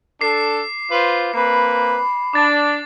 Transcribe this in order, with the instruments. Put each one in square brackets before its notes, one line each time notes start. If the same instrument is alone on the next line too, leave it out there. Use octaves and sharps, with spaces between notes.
[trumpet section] D4 A4 [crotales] D6 C7
[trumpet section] F4 B4 C5
[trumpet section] A#3 C4 B4 [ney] B5 [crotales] C7
[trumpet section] D4 [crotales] D6 A6